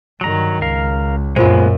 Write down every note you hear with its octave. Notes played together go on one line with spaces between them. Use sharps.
G2 D#3 F#3 A#5
C#2 A#4 F5
F#2 A#2 G#3 A#3 B3 F4 C5